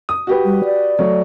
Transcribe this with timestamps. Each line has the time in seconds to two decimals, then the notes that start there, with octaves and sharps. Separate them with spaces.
0.09 D#6
0.27 F#4 G4 B4
0.45 G3
0.65 D5
0.99 F#3 A3